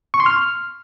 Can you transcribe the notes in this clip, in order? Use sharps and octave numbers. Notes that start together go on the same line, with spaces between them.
C#6
C6
F6